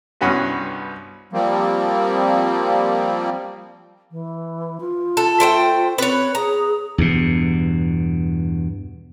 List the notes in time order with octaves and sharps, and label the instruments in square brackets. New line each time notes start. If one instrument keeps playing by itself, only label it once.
[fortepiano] C2 G2 B3 C#4 F#4 B4
[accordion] F3 G3 A#3 C4
[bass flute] E3
F4
[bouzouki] A4
A3 C5 G5
[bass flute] C4 [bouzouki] B4 C#5
[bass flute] G#4 [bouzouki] A#5
[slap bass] E2 G2 B2